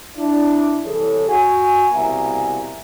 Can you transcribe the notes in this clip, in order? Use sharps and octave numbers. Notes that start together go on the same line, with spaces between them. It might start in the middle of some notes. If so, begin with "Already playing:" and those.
D4 E4
C2 E3 G#4 A4 C#5
F#4 G#5
C2 B2 A#3 E5 G#5 A#5